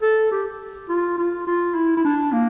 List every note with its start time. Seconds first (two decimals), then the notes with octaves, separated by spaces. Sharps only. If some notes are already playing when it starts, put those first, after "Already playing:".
0.02 A4
0.31 G4
0.89 F4
1.18 F4
1.47 F4
1.75 E4
1.97 E4
2.05 D4
2.32 A#3